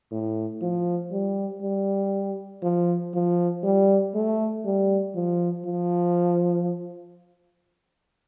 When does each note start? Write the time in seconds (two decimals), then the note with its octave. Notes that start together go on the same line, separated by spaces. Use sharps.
0.12 A2
0.62 F3
1.11 G3
1.62 G3
2.62 F3
3.14 F3
3.63 G3
4.14 A3
4.64 G3
5.15 F3
5.66 F3